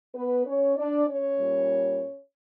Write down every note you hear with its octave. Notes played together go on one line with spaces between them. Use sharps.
B3 B4
C#4 C#5
D4 D5
C#4 C#5
A#2 G3